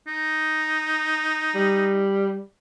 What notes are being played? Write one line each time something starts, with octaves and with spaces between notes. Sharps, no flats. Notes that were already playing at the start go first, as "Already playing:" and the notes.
D#4
G3